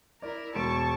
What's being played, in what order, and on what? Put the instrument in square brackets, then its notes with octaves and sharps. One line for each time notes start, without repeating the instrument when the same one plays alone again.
[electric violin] E4 A#4 [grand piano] D5
[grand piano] E1 D7 [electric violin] A5 C#6